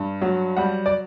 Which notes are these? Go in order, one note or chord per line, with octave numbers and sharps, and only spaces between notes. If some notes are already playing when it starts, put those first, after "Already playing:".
Already playing: G2
F#3
G3 F#5
D5